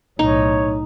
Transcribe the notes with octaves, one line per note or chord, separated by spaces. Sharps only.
B1 A2 D#4 C#5